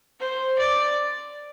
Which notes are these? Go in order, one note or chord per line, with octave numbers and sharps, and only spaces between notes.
C5
D5